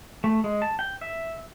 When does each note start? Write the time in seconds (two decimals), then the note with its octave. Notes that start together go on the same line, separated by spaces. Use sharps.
0.24 A3
0.44 G#3
0.62 A5
0.79 G5
1.01 E5